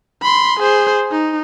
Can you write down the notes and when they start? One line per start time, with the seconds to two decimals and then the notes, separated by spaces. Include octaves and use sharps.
0.22 B5 C6
0.60 G#4 C5
1.11 D#4